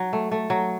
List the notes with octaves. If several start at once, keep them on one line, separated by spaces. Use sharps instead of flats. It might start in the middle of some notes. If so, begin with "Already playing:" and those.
Already playing: F#3
A3
A3
F#3